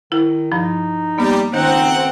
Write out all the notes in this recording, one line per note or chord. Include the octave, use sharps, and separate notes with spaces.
D#3 E4
G2 F3 D#4
G3 A#3 B3
C#2 D#3 C4 D#4 C5 F#5